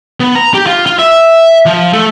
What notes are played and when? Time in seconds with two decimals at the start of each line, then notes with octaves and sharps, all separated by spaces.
0.20 B3
0.35 A#5
0.54 G4
0.66 F4
0.86 F4
0.99 E5
1.66 F3
1.93 A3